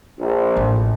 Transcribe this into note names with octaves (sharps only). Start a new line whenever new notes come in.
A#1
A1